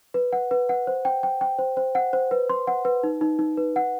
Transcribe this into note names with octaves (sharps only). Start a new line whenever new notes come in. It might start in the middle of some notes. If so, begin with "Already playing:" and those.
B4
F#5
B4
F#5
C5
G5
G5
G5
C5
C5
F#5
C5
B4
C6
F#5
B4
D#4
D#4
D#4
B4
F#5